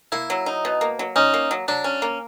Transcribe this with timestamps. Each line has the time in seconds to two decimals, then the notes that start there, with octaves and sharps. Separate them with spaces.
0.12 A#3 E4
0.30 F#3
0.46 D#4
0.65 B2
0.81 A#3
0.99 F#3
1.16 C#4 D#4
1.34 A#3
1.51 F#3
1.68 F#3 D4
1.84 C#4
2.02 A#3